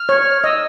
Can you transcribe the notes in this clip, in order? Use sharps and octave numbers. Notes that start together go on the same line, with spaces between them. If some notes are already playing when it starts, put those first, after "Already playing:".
Already playing: F6
C#5
D#5 E6